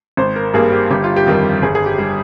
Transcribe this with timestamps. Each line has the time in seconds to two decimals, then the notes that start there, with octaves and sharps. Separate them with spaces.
0.17 G#1 C5
0.36 A#4
0.54 G2 G3 A#3 G#4
0.72 G4
0.91 G1 G4
1.04 F4
1.16 G4
1.26 F2 D#3 G3
1.62 G1 G#4
1.75 G#4
1.86 G4
1.98 G3